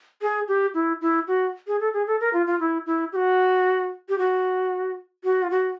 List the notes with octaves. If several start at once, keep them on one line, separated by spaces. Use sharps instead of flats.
G#4
G4
E4
E4
F#4
G#4
A4
G#4
A4
A#4
F4
F4
E4
E4
G4
F#4
G4
F#4
F#4
F4
F#4